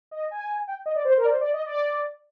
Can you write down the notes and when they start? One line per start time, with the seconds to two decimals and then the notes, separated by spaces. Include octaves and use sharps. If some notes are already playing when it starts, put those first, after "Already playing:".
0.11 D#5
0.31 G#5
0.68 G5
0.86 D#5
0.96 D5
1.05 C5
1.17 A#4
1.25 D5
1.29 C5
1.41 D5
1.53 D#5
1.66 D5